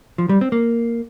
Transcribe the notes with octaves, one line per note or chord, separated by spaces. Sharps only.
F3
G3
C4
A#3